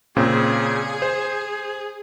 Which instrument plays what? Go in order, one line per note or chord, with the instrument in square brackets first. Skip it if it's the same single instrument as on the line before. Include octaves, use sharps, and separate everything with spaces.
[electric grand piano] A#2 C#3 C4 [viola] G#4
[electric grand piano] C5